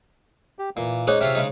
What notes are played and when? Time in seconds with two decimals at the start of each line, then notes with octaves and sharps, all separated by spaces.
0.59 G4
0.77 A#2 E3 A#3
1.07 G#3 C#4 D#4 G#4 C5 C#5
1.21 C3 C#4 F4 E5 F6
1.35 C#3 G#3 D#4